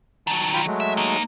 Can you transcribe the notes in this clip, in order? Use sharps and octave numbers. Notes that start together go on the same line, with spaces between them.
D#3 F#3 A5
F4 G5 B5
F#3 G#3 A3
E5
A#3 D#4